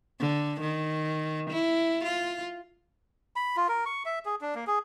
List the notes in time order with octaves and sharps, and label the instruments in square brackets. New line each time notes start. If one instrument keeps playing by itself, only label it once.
[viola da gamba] D3
D#3
E4
F4
[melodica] B5
F4
A#4
C#6
E5
G#4
D4
A#3
G#4